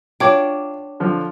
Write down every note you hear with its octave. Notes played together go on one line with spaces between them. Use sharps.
D4 F4 C#5 F#5 G5 D6
D3 F3